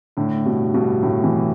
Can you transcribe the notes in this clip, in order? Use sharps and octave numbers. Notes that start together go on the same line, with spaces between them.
A2 D3
G2 B2
G2 B2
A2 D3
B2 E3